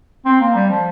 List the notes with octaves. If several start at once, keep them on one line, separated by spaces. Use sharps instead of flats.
C4
A#3
G3
F3